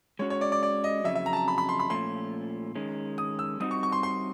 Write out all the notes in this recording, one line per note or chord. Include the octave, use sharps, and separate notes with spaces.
G#3 C#4 F#4 C#5
C#5
D5
D5
D5
D#5
F2 C#3 F#3 E5
E5
A#5
A5
A#5
B5
B5
C6
B5
A#2 F3 A3 C#4 C6
D#3 G#3 C#4
D#6
E6
G3 C4 D#4 F#4 D#6
C#6
C#6
C6
C6